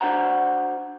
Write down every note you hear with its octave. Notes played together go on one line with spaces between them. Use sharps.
D4 F#4 C5 F#5 A#5